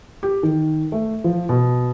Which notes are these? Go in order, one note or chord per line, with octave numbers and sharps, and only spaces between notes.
G4
D#3
A3
F3
B2